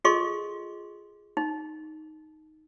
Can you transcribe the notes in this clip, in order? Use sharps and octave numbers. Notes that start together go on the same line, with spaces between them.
F4 G#4 A4 D#5 C6 C#6
D#4